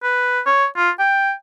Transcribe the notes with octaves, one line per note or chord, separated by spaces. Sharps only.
B4
C#5
F4
G5